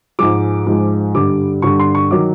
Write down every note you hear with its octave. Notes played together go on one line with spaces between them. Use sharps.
G#2 F3 G#3 D6
G#2 F3 G#3
G2 D3 G3 D6
G2 D3 G3 C#6
C6
C#6
D#3 F#3 D6